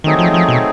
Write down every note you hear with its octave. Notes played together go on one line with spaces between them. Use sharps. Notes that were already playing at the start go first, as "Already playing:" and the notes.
D#3 F#3 A3 C4 D#4 G#4
F3
F3
B2